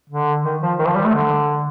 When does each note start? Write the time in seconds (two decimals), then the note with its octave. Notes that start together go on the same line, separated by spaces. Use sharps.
0.10 D3
0.44 D#3
0.62 F3
0.79 D#3
0.87 F3
0.95 G3
1.04 A3
1.13 D3